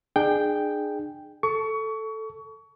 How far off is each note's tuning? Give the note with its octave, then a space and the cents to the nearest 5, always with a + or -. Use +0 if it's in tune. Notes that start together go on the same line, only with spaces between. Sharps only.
D4 +40 G#4 +0 G5 +0
A4 +0 C#6 +25